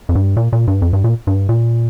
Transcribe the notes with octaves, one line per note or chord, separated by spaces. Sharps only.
F2
G2
A#2
A#2
G2
F2
G2
A#2
G2
A#2